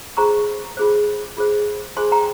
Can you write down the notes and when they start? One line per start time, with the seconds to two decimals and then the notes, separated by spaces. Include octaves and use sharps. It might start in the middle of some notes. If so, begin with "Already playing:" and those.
0.17 F4 G#4 C5 A#5 C#6
0.77 F4 G#4 C5
1.37 F4 G#4 C5
1.97 F4 G#4 C5 G#5 C6
2.12 G5 A#5